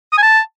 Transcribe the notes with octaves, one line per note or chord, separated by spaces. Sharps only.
D#6
G#5
A5